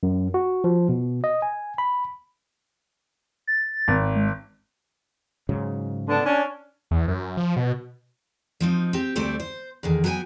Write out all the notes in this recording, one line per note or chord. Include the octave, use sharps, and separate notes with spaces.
F#2
F#4
F3
B2
D#5
G#5
B5
A6
G#1
G#3
G#2 C#3 F#3
D3 B3 D4
C#4 D4
E2
F#2
F3
B2
F3 C4 D#4
C4 G4
D2 G3 A3 C4 D5
C5
E2 D3 D#3
F#3 B3 A4 G5 G#5